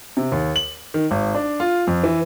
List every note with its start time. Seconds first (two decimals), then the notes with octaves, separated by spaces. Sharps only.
0.17 C3
0.32 D#2
0.56 F#7
0.94 D#3
1.11 G#1
1.35 D4
1.60 F4
1.87 F2
2.03 E3